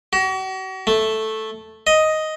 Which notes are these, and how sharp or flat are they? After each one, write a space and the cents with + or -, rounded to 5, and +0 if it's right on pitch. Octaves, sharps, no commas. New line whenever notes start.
F#4 +40
A3 -5
D#5 +5